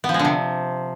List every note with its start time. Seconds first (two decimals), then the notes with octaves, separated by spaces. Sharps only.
0.04 B3
0.09 F3
0.14 G#3
0.19 D3
0.25 C3